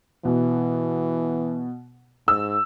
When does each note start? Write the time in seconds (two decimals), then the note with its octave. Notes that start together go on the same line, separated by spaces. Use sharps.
0.25 B2 E3
2.28 G#2 E6